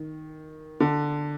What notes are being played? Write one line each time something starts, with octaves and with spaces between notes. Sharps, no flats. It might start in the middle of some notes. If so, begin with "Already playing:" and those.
Already playing: D#3
D3